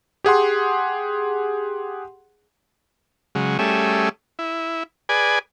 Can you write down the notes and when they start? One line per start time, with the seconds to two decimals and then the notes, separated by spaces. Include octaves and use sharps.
0.24 G4 G#4 F#5 C6
3.35 C#3 F#3 G#3
3.59 G3 A3 C#4 G#4 E5
4.39 E4
5.09 G#4 B4 D5 G#5